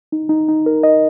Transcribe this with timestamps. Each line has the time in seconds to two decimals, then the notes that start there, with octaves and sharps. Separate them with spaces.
0.12 D#4
0.29 D#4
0.48 D#4
0.66 A#4
0.83 D#5